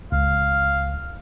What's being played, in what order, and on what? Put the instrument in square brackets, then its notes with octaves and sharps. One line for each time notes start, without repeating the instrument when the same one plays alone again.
[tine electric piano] C#2 [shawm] F5